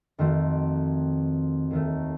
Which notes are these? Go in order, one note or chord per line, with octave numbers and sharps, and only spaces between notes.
F2 D#3 A3 C4 F#4
D#2 D#3 A3